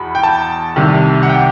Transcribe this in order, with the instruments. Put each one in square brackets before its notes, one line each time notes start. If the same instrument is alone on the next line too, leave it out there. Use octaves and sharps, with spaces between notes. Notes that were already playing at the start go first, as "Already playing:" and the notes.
Already playing: [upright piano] E2 B2 B5
G5
A5
C2 C3 D#3
F#5
G5